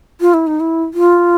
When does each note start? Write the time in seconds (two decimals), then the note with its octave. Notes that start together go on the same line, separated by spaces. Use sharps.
0.21 F4
0.34 E4
0.47 D#4
0.60 E4
0.94 F4